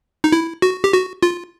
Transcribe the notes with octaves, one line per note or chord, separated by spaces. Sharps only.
D#4
E4
F#4
G4
F#4
F4